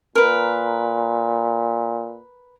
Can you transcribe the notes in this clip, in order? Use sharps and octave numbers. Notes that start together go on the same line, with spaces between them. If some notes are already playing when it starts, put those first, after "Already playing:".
A#2 A#4 B4